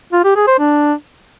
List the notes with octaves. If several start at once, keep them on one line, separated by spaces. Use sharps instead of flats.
F4
G4
G#4
C5
D4